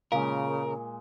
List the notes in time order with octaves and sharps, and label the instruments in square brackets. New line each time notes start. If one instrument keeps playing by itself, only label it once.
[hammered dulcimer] A#2 G#3 [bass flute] C#3 [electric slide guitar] A#4 [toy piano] F5